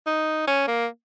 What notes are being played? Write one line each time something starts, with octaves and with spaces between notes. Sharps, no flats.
D#4
C#4
A#3